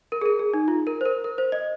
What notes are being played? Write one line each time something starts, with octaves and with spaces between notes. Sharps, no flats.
A#4
G#4
A#4
G#4
D#4
F4
A#4
C5
A#4
A#4
C5
D#5